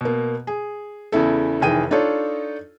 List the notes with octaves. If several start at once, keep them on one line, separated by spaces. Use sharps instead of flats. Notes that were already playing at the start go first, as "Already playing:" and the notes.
B2 A#3
G#4
E2 C#3 E4 A4
F1 D#3 E3 G#4 G5 D#7
D4 D#4 F4 A4 C#5